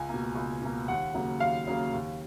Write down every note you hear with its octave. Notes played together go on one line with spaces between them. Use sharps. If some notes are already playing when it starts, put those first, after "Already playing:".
Already playing: C#2 G#5
B2 A#3
C#2
B2 A#3
D#2 F#5
C#3 F#3 A#3
D#2 F5
C#3 F#3 A#3
D#2